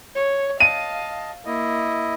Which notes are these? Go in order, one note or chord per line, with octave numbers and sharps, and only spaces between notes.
C#5
D#5 F5 A5 D#7
A#3 E4 D#5